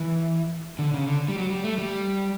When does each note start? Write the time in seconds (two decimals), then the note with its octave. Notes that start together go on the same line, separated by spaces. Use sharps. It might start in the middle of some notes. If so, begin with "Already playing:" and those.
Already playing: E3
0.79 D3
0.94 C#3
1.07 D3
1.28 G3
1.36 F#3
1.50 G3
1.64 A3
1.78 G3